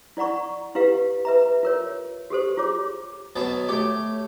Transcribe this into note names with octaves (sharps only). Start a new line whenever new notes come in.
E4 D5 F#5 A#5 C#6
E4 G4 B4 F5
B4 E5 A#5
F4 A#4 C#5
F#4 G4 A4 C5
F4 G#4 C#5 D6
B2 F#3 A5
A3 G4 C#5